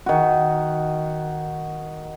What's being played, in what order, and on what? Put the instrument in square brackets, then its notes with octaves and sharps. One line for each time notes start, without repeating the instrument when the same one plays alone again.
[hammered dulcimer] D#3 F#4